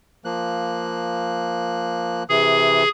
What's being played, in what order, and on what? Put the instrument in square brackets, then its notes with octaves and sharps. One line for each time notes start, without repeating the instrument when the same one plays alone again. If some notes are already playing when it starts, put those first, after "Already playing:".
[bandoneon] F3 A#3 F#6
[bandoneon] C3 E3 [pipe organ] G#4